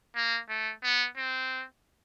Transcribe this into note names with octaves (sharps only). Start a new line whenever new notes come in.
A#3
A3
B3
C4